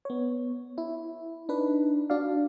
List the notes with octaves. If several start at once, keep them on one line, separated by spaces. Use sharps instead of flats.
B3 C#5
E4
D4 D#4 B4
D4 F#4 D5 F5